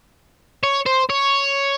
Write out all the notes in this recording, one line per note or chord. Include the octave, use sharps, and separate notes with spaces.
C#5
C5
C#5